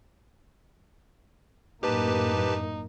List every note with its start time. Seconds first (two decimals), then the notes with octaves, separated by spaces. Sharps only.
1.83 F#2 A2 A#3 D#4 G4 B4 A5